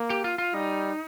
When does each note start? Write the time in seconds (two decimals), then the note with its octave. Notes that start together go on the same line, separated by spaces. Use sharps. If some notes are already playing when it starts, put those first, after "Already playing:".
Already playing: A#3
0.10 G4
0.24 F4
0.38 F4
0.54 G3 D#4